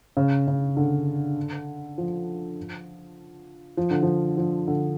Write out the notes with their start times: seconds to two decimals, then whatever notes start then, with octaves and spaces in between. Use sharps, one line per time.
0.17 C#3
0.48 C#3
0.77 D3
1.98 F3
3.77 F3
3.91 D3
4.03 F3
4.38 F3
4.68 D3